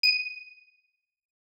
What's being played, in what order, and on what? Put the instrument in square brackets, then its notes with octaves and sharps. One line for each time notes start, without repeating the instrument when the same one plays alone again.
[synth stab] D#7